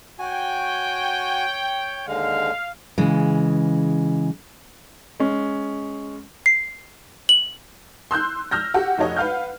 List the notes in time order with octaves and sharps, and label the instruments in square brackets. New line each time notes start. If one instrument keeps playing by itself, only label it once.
[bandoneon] F#4 G#5 [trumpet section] C#5 G5
[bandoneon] D#2 D3 G#3 [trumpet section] F5
[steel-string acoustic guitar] C#3 E3 G#3
[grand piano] G#3 C#4
[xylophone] C7
F#7
[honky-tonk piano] C6 E6 F#6 G6
E6 F6 G6 A#6
F#4 G4 F#5
F1 D#4 F#4 C#5 D#5
B4 F5 F#5 F6 G6